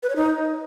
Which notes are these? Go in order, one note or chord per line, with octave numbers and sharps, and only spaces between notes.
B4
C#5
D#4